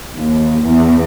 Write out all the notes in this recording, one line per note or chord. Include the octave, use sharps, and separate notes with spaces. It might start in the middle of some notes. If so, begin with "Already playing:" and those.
D#2
E2